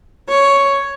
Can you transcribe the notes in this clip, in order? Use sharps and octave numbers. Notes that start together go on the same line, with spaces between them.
C#5